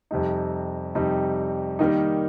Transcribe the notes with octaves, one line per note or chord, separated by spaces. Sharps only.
F2 C3 G3 D#4
F2 C3 G3 D#4
D#3 G3 A#3 D#4